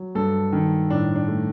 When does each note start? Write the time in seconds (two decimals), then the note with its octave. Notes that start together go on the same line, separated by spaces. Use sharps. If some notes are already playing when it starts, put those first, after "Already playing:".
Already playing: F#3
0.15 G2 A4
0.52 D#3
0.90 A2 D4
1.15 D4
1.28 A3